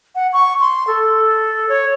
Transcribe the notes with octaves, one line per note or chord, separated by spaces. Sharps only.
F#5
C#6
C6
A4
C#5